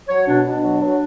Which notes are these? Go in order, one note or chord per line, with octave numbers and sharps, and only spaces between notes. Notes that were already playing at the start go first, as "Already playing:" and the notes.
F#3 C#5
B2 D4
B2 D4
F#3
F#3